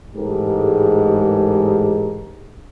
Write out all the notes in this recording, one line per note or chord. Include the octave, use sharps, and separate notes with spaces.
A1 G#2 G#3 G4 A4 A#4